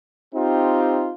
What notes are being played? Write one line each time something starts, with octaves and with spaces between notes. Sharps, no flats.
C4 D#4 F4 G4